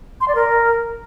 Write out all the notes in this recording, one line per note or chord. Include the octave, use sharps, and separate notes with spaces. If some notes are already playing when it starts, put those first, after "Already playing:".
C6
D5
A#4